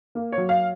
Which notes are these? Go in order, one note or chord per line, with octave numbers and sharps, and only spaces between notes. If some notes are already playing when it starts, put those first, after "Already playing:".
A#3
C#5
F#3
F5